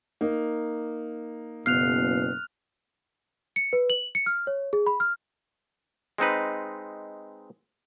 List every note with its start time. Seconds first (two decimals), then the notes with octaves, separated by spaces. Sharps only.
0.21 A#3 D#4
1.66 F#1 B2 B3 F6 F#6 C7 F7
3.56 C#7
3.73 B4
3.90 F#7
4.15 C#7
4.26 F6
4.47 C#5
4.73 G#4
4.87 B5
5.00 F6
6.18 G#3 C4 D#4 B4